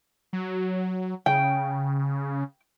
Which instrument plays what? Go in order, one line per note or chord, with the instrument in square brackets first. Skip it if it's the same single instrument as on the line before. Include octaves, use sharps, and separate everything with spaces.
[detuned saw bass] F#3
[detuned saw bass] C#3 [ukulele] G5